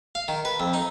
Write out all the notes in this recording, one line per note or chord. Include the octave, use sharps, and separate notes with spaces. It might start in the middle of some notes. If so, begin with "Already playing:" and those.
F5
D#3
B4
F2
D#4